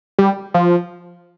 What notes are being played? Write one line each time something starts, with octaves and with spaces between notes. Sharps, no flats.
G3
F3